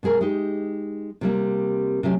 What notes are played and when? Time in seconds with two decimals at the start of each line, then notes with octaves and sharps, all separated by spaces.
0.03 B2 G#3 G#4 A#4
0.21 G#3 D#4 G4
1.21 C3 G3 A#3
2.03 C3 F#3 A3 C#4